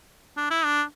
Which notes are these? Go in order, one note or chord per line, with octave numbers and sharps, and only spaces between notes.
D4
E4
D4